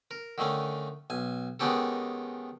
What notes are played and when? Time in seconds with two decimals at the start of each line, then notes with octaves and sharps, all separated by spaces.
0.11 A#4
0.38 D3 D#3 A3 C#4
1.10 B1 G#5
1.60 D#3 G#3 B3 C#4 G4 A4